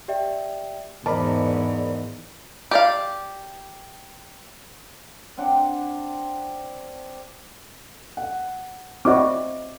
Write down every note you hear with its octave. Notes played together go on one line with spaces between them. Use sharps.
G4 D5 E5 G5
E2 G#2 A#4 C5 D5 D#5 A5 B5
G4 D5 F5
C4 D4 F#5 G5
F#5
C4 E4 F#4 D5 D#5 D6